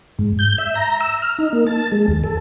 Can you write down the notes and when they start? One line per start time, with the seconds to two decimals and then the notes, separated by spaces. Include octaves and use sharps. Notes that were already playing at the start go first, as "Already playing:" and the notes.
0.19 G#2
0.39 G6
0.58 E5
0.76 A#5
1.01 E6
1.22 F6
1.38 D#4
1.53 A#3
1.67 A5
1.92 G#3
2.08 D#2
2.24 A4